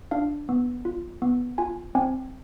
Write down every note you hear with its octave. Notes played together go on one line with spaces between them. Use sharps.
D4 F5
B3
F4
B3
F4 G#5
C4 G#5